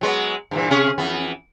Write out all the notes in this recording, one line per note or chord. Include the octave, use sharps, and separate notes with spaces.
F#3 G#3 B3
G2 A#2 E3
C3 C#4 G#4
F2 E3 B3